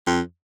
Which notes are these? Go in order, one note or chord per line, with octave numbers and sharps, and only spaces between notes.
F2